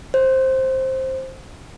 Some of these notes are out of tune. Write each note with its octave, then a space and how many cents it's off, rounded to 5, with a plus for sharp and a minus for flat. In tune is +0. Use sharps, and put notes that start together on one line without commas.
C5 +10